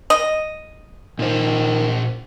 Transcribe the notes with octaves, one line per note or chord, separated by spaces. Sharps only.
D#5
A#2 D#3 C5